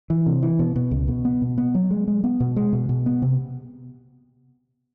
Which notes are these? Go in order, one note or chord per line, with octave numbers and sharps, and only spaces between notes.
E3
C3
E3
B2
B2
C#2
B2
B3
B2
B3
F#3
G#3
G#3
B3
B2
G#3
B2
B2
B3
C3